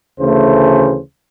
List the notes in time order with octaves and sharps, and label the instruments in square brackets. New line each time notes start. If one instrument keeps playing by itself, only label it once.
[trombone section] D2 C#3 E3 A3 C5